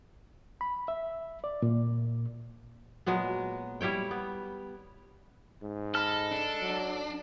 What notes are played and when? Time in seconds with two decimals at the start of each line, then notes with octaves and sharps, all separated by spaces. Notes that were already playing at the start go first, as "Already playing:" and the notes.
0.61 B5
0.88 E5
1.44 D5
1.62 A#2
3.06 A#2 F#3 G#3 B3
3.81 G3 E4 C#5 G5
4.11 B3
5.62 G#2
5.95 A4 D#5 B5 F6
6.31 D4
6.61 F#3